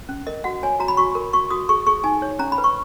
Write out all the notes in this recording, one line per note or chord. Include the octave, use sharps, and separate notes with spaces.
C#4
A#4 D#5
F#4 F#5
C#5 G#5
F#4 A#5
B5
F#4 C#6
A#4
F#4 C#6
F#4 D#6
G#4 C#6
G#4 C#6
D#4 G#5
C#5
C#4 A#5
B5
B4
C#6